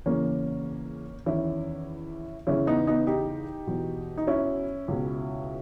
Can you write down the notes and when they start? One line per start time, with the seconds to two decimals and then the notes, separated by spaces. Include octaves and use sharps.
0.06 E2 C#3 E3 A#3 C#4
1.26 E2 D#3 C#4 E4
2.47 E2 C#3 E3 C#4 E4
2.67 B3 D#4
2.87 B3 D#4
3.07 D#4 G4
3.67 E2 B2
4.17 D#4
4.27 C#4 E4
4.88 C#2 B2